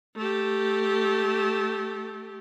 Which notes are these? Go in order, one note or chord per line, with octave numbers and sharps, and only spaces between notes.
A3 G4